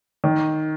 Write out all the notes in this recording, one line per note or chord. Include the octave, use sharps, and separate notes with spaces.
D#3